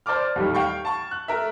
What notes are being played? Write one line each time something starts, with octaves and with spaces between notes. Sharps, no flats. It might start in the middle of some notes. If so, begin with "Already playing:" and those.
C5 D5 A5 D6 F6
D#2 A2 D#3 G3 D#4
F5 G5 C#6
A5 C#6
F#6
A3 A#4 E5